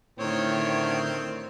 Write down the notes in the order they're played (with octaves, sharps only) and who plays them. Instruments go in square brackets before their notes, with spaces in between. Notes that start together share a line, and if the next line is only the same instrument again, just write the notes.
[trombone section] A2 D3 [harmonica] D#3 C4 [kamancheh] C#5